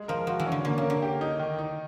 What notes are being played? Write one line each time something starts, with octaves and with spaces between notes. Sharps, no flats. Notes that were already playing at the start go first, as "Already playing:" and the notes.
Already playing: G#3
F3 A#4
F3 F#4
E3
C#4
D3
D3 A#3
C#3
A#4
D3
G4
D#4
D#3
D#4